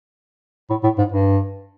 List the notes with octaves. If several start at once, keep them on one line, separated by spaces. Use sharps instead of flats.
A2
A2
G#2
G2